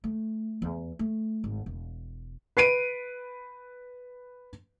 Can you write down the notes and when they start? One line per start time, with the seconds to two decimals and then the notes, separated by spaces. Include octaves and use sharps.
0.04 A3
0.62 E2
0.99 A3
1.44 G#1
1.66 E1
2.57 B4 C7 D7 D#7